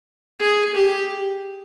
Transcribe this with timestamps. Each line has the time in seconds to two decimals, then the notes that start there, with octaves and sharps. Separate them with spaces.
0.39 G#4
0.75 G4